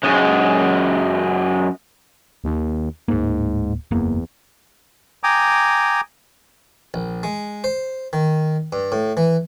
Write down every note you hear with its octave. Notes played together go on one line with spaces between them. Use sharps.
F#2 G#3
D#2
D1 G#2 A#3
F#1 E2 A#3
G5 G#5 A#5 D6 D#6
A#1
G#3
C5
D#3
G2
A2
E3